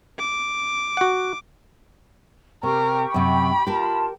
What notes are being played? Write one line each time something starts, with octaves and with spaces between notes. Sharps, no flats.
D6
F#4 F#5
C3 G4 A#4 G5 C#6
F#2 C3 B5
F4 G4 A#4 A5